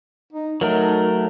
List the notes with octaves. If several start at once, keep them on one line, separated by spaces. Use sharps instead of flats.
D#4
F#3 A3 D#4 A#4